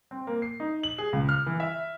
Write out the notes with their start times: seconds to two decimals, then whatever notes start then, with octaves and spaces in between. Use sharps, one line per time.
0.11 C4
0.27 A#3
0.42 C7
0.60 D#4
0.83 F#7
0.98 G#4
1.13 C#2
1.29 F6
1.46 E3
1.60 E5